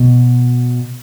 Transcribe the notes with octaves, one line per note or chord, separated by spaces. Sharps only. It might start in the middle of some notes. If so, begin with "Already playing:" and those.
Already playing: B2